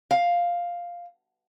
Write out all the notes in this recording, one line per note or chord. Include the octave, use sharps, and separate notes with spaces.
F5